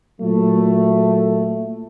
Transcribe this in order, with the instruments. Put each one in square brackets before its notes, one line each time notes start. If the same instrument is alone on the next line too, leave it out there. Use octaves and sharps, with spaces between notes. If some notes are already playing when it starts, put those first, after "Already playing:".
[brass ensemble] A#2 F#3 A3